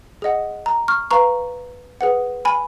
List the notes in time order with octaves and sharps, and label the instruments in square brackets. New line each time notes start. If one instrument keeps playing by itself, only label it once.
[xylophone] G#4 D#5 F#5
A#5
C#6 F6
B4 F5 A#5 C#6
G#4 B4 F#5
G#5 B5